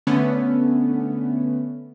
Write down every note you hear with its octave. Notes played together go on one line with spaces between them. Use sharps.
D3 A3 B3 C#4